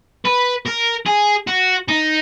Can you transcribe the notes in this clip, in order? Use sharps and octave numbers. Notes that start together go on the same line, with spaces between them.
B4
A#4
G#4
F#4
D#4